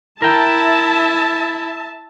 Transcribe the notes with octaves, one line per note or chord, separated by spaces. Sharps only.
E4 A#4 E5 G5 A5